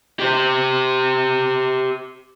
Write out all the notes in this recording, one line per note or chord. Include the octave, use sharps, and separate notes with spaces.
G4 C5